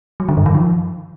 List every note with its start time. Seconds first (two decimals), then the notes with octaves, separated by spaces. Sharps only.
0.20 F#3
0.29 D3
0.37 G2
0.46 D#3
0.55 F3